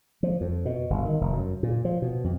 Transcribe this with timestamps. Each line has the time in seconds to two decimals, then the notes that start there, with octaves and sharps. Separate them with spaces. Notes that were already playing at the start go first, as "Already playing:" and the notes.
0.23 F3
0.41 F2
0.65 B2
0.90 G1
1.05 D#3
1.21 F1
1.33 F#2
1.63 A#2
1.85 F3
2.02 B2
2.24 F2